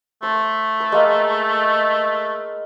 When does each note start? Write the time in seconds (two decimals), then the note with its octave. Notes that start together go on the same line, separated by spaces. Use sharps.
0.23 A3 C5
0.80 B4
0.92 G#3 A#3